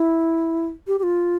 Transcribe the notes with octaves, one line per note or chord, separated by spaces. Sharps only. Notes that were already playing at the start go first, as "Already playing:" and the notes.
Already playing: E4
G4
G4
F4